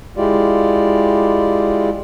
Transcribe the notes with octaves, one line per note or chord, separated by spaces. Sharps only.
G#3 E4 F4 G4 D5